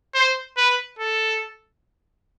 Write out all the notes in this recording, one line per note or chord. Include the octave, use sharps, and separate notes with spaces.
C5
B4
A4